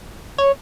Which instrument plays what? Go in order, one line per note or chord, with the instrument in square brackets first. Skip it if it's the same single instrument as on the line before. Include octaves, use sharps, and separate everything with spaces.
[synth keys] C#5